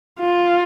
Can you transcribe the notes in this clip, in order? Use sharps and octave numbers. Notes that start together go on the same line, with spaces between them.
F4